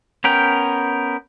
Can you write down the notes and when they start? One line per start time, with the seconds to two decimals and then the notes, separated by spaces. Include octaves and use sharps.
0.24 B3 C#4 A#4 G5